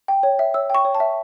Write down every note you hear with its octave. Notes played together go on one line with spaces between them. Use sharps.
G5
C#5
E5
C#5 E6
G5 C#6
C#5
A5
E5